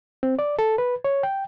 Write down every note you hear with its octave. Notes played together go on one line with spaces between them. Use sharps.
C4
D5
A4
B4
C#5
G5